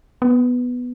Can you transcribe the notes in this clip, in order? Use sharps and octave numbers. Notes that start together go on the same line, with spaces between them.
B3